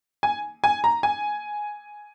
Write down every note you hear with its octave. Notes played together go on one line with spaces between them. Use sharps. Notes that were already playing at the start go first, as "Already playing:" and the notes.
G#5
G#5
A#5
G#5